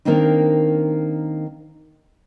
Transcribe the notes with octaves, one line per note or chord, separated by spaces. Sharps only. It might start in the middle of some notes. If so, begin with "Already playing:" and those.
D#3 A#3 C4 D4 D#4